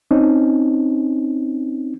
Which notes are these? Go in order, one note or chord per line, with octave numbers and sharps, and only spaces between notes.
C4 C#4 D#4